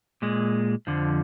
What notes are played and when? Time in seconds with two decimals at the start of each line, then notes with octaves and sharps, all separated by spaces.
0.22 A#2 G#3
0.87 F2 D3 F3